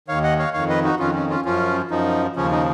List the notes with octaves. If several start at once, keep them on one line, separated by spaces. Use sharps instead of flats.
D#2 D#3 C#5 F5
D#5 F#5
C#5 F5
F2 D#3 C#5 F5
B4 D#5
D#4 F#4
F2 D#3 C#4 F4
C#4
C#4 F4
F#2 F3 C#4 F4
F#2 F3 D#4
D#2 C#3 F3 C#4
D#4